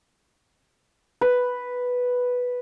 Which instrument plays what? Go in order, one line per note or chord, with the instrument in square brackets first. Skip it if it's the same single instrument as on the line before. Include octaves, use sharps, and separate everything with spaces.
[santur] B4